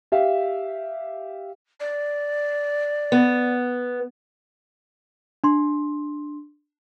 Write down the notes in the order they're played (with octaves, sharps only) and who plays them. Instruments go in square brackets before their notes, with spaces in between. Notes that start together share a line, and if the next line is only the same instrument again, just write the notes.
[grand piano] G4 E5 F5
[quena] D5
[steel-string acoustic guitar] B3
[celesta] D4 C6